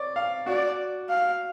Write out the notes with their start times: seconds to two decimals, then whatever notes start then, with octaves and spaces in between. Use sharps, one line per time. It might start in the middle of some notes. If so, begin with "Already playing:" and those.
Already playing: C#5 D5
0.16 F5
0.46 F#4 D5
1.09 F5